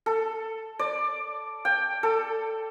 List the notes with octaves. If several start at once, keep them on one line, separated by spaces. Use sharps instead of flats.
A4
D5
G5
A4